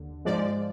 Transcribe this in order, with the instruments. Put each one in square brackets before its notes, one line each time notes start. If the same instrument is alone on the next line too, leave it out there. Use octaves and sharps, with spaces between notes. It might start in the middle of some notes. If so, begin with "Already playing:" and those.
Already playing: [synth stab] D#2 D3
G#2 F3 G#3 D5